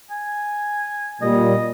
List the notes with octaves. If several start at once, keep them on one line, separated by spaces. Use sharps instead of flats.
G#5
A#2 G3 D#5